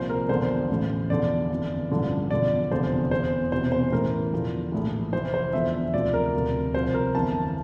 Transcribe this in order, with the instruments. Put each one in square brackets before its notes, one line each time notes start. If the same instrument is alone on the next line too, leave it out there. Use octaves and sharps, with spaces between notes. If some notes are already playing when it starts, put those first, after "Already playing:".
Already playing: [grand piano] C2 A#2 F3 C5
A#4
E2 D3 F3 C5
A1 A2 E3
E2 D3 F3 D5
G1 F2 E3
A1 G2 D3 F3
E2 D3 F3 D5
F1 E2 D3 F3 C5
E2 E3 C5
E1 E2 C3 E3 C5
C5
A1 A2 E3 A#4
E2 D3 F3
A#1 A2 E3
F1 F2 E3 C5
C5
E2 D3 F3 E5
D2 C3 F3 D5
A#4
D2 C3 F3
C2 C3 F3 C5
A#4
G1 F2 E3 A5